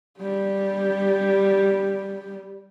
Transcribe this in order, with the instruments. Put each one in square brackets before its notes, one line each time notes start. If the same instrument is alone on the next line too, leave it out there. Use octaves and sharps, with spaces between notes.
[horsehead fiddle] G3 G4